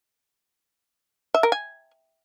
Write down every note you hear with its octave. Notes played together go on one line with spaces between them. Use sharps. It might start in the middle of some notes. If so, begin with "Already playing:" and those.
E5
A#4
G#5